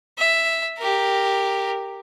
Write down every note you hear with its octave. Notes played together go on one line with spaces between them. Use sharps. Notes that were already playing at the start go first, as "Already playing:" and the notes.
E5
G4 A#4